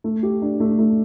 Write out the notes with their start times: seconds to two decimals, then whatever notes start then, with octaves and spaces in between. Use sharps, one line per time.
0.04 A3
0.23 G4
0.42 D4
0.60 A3
0.79 A3